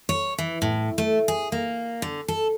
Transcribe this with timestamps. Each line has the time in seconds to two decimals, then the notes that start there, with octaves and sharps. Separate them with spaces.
0.09 C#5
0.38 E3
0.62 A2
0.98 A3
1.28 G#4
1.52 A#3
2.02 D3
2.28 A4